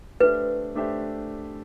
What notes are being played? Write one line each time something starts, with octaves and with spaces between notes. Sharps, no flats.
A3 D4 G4 B4 C5 E5
A3 D4 G4 C5 E5